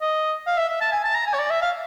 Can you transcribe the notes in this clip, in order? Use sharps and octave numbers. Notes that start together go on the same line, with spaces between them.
D#5
F5
E5
E5
A5
G#5
A5
A#5
G#5
C#5
D5
E5
F5